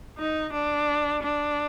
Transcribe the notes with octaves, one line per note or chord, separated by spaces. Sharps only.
D#4
D4
D4